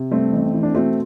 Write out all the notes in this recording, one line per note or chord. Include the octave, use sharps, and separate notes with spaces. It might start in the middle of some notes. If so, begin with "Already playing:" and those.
Already playing: C3
G2 A3 C4
A1
E3
D4
B2 A3 C4